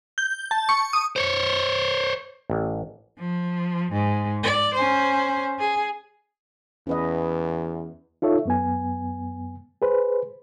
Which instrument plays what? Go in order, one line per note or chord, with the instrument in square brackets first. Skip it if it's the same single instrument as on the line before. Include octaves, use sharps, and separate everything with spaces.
[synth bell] G6
A5
C#6
D#6
[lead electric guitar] C5 C#5
[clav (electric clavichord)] A1
[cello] F3
G#2
D5
C#4 C5
G#4
[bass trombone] E2 [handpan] C#4 B4 D#5
[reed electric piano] D#4 F4 A4 C#5 E5
F#2 B3 G#5
G#4 B4 C5